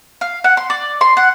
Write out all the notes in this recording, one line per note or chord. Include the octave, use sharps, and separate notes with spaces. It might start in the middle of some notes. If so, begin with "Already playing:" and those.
F5
F#5
C6
D5
C6
F#5